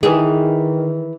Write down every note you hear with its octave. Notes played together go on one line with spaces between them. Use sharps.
D#3 E3 G#4